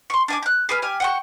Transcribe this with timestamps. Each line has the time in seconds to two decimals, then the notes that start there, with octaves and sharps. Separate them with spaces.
0.10 C6 C#6
0.28 D4 G#5 D6
0.43 F#6 G6
0.69 G#4 B4 F6
0.82 G4 G#5 F6
1.00 F#5 G5 C#6